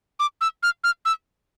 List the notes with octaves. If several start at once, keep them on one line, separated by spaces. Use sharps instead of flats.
D6
E6
F6
F6
E6